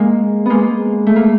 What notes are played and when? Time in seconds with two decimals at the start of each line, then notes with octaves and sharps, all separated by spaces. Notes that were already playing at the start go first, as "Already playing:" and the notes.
Already playing: G#3 A#3
0.46 G#3 A#3 B3
1.07 A3
1.16 A#3